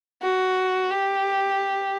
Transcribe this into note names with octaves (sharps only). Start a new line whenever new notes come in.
F#4
G4